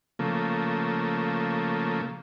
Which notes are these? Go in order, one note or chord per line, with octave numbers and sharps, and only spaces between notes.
C#3 F3 A3 A#3